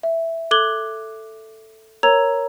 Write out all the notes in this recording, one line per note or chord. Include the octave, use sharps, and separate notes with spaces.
E5
A4 D6 F#6 G#6 F#7 G7
A#4 C#5 A#5 E6 G#6 F7